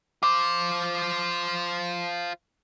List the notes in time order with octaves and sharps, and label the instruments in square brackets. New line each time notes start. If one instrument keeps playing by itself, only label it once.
[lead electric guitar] F4 C5 [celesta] D6